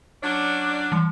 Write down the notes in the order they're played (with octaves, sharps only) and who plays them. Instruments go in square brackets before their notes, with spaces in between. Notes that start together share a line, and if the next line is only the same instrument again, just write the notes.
[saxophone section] F#3 C#4 D4
[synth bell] E3 G3